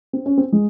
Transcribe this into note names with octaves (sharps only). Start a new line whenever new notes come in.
C4
C#4
C4
G#3